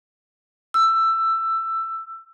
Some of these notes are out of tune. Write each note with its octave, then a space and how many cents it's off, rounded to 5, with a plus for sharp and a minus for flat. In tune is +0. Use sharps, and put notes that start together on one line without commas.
E6 +15